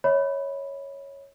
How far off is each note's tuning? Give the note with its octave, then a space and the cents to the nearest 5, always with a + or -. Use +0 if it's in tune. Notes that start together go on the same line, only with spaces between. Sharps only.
C#5 +0 E5 -45 B5 +0